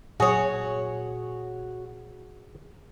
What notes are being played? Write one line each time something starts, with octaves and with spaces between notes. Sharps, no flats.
A#2 F#3 F#4 G#4 C#5